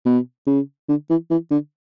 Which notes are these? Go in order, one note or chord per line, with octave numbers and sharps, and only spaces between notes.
B2
C#3
D3
E3
E3
D3